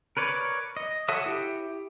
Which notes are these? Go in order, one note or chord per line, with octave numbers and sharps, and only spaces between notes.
A#4 B4 C#5 D5
D#5
F#4 A4 C#5 E5 D#6
E4 G4